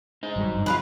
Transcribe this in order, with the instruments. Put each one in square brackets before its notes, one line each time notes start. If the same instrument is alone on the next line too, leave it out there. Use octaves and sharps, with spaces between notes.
[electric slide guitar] D#4 C5 D#5
[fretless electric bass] G#1 F#3 G3
G2
[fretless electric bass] F3 F#3 [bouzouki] F4 G#4 B4